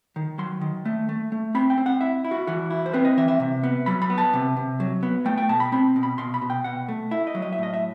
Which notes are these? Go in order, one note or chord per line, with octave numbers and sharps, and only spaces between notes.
D#3
F#3 C6
D#3
A3
A3
A3
C4 B5
G5
C4
F#5
E4 E5
E4
F#4
E3 F#4
E4
C5
C4 B4
D#5
E3 E5
E5
C3
B3
F#3 B5
B5
B3
A5
C3
C3
F#3
B3
A3 G5
G5
B2 A5
B5
C4 B5
B2
B5
B2 C6
B5
B2
G5
B2 F#5
A3
E4 E5
D#5
F#3
D#5
E5
A2 D#5
E5